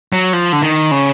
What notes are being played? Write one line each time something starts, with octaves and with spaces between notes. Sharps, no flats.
F#3
F3
D3
D#3
C#3